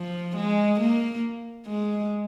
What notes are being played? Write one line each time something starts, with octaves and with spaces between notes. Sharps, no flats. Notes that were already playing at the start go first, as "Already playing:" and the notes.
Already playing: F3
G#3
A#3
G#3